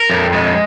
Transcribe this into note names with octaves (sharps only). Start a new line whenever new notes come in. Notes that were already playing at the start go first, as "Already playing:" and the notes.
Already playing: A#4
F2
G#3